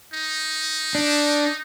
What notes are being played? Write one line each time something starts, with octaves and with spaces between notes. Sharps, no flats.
D#4
D4